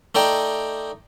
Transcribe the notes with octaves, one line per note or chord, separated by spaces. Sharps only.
A3 D#4 D5 G5